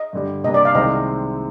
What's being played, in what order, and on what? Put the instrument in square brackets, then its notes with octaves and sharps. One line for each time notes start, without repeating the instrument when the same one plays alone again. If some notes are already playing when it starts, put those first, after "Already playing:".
Already playing: [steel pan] D#5
[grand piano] G2 D3 G3
[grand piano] C3 G3 A#3 D4 [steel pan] D#5
[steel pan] D5
F5
[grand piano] C2 C3 D#3 G#3 C4 [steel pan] D#5